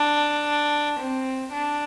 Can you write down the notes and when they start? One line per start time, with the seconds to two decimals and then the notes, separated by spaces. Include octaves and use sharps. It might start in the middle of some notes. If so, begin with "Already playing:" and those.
Already playing: D4
0.99 C4
1.52 D4